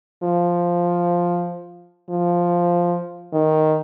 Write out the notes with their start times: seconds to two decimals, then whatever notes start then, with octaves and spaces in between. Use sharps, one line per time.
0.23 F3
2.10 F3
3.34 D#3